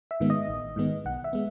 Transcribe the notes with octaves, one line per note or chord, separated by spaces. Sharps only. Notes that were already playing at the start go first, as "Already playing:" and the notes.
E5
G#2 D#3 G#3 B3
D#5
A1
G#2 D#3 G#3 B3
B1 F#5
E5
G#3 B3